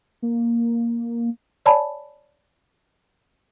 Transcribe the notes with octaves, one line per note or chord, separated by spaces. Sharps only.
A#3
C#5 D5 G#5 A5 B5